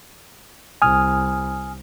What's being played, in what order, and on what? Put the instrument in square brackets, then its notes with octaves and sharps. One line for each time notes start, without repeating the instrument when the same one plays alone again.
[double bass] C2 [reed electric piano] G#5 D#6 F6